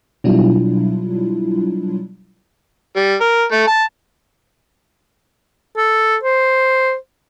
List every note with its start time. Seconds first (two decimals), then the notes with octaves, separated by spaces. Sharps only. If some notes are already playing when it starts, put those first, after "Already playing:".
0.24 B2 F#3 G3 D4 E4 F4
2.96 G3
3.21 A#4
3.52 A3
3.67 A5
5.77 A4
6.23 C5